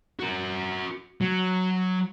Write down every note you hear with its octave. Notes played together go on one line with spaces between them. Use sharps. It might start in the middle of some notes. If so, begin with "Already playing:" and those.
F#4 A#4
F#3